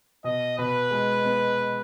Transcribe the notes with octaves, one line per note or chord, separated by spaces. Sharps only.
B2 D#5
B2 B4
G#3
B3